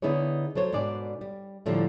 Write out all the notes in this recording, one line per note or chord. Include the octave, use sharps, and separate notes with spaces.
D3 B3 D#4 E4 G#4 C#5
F#3 A4 C5 C#5
G#2 B2 D4 D5 G#5
G3
A2 D3 F3 G3 A#3